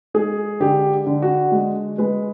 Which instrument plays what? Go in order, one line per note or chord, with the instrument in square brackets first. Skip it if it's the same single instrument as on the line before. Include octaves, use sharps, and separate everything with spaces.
[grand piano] G#3 G#4
D3 G4
D3
F#4
G#3
G#3 B4